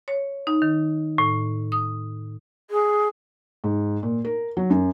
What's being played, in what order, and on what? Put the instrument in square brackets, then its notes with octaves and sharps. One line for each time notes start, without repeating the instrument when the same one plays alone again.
[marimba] C#5
D#4
D#3
A2
D#6
[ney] G#4
[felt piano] G#2
A#2
A#4
F#3
F#2